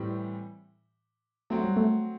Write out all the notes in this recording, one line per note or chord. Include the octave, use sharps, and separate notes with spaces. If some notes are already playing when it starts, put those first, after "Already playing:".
Already playing: A2 E3 G3 C4 G4
F#3 A3 C4 F#4
G3
A3